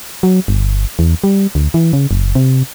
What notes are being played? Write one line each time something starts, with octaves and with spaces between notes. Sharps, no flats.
F#3
G1
E2
G3
D2
E3
C#3
F#1
C3